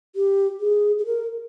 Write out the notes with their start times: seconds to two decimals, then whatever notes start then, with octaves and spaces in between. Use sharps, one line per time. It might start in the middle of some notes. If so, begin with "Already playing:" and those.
0.16 G4
0.60 G#4
0.98 G#4
1.06 A#4